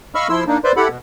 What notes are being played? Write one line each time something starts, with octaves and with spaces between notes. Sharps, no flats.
D#5 F5 B5 C#6 E6 F6
F3 E4 C6 E6
A#3 D4 D#4
B4 C5 D5 E5 C6
E4 G4 A4 F#5 B5
B2